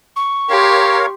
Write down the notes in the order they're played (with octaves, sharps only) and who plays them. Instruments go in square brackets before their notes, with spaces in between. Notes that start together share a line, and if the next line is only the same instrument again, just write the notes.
[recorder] C#6
[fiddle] G4 C6 [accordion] A#4 C#5 F5